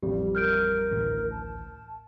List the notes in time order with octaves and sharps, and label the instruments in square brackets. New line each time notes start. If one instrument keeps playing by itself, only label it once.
[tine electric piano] A1 F2 G3 [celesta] G4
[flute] A#4 [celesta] F6 G6 D7
[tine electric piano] A1 D2
[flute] A5